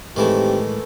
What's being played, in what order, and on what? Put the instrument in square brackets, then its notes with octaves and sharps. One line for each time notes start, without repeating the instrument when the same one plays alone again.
[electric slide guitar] A2 G#3 [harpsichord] D#3 E3 A3 [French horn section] C4 D#4 G4